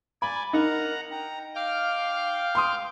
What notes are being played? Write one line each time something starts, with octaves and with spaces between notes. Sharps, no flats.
D5 G#5 B5
D#4 A#4 F#5 A#5
G5 A#5
F5 G5 D6 F6
C6 D#6